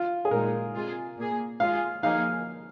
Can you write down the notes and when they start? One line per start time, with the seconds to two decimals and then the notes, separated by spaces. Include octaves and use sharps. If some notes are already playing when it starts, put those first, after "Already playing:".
Already playing: F4
0.25 G#4
0.31 A#2 G#3 D#4 A#4
0.75 C3 G#3 F4 G#4
1.17 A#2 A#3 G#4
1.60 G#3 F4 G#4 F5
2.03 F3 A#3 D#4 G#4 F5